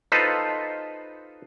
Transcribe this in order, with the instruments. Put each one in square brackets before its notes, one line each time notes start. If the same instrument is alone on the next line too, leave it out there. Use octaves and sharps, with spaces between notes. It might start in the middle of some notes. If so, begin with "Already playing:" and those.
[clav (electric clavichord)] D#4 F4 A4 B4 C5